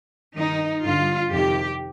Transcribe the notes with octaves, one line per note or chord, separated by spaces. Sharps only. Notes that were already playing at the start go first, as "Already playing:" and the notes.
G2 D#3 D#4
G2 D3 F4
F2 C3 D#3 G4